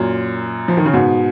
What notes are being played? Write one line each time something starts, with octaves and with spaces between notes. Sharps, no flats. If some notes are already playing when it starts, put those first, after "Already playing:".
Already playing: F#2 A#2
F3
D#3
C#3
G#2 B2